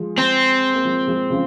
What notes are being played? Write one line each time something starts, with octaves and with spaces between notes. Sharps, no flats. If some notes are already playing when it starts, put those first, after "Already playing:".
Already playing: F3 G#3
C4
A#3
F3 G#3
F3 G#3
C#3 F3